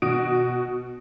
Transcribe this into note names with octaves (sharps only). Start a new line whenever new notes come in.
B2 F#4 D#6 D7